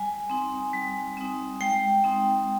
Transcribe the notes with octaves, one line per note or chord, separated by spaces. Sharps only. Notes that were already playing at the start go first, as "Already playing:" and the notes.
Already playing: G3 G#5
C4 D#4
G3
C4 D#4
G#3 G5
C4 D#4